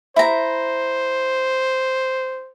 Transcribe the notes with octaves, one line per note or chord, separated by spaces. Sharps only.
E4 C5 A#5